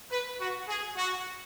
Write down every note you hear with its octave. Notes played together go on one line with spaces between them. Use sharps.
B4
F#4
G#4
F#4